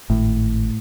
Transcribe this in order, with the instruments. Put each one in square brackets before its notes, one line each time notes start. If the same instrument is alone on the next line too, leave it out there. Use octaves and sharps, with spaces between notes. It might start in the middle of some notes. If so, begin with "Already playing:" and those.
[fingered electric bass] G#1 [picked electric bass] A2